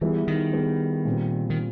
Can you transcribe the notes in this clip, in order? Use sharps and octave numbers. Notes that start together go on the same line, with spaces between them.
E3 G3 B3 E4 G#4
D#3
G3 B3 E4 G#4
A#2 G3 C4
D#3